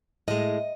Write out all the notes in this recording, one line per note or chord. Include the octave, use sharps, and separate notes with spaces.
A2 G#3 D#5